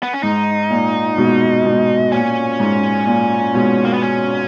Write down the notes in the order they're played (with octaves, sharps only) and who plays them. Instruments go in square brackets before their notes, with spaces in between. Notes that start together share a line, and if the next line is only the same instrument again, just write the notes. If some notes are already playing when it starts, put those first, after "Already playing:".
[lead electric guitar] B3
C#4
[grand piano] G#2 [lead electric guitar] D#4
[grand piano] A#2
G#2 B2
G#2 B2
[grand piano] A#2 [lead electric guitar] C#4
[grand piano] G#2
A#2
G#2 B2
[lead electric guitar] A#3
B3
C#4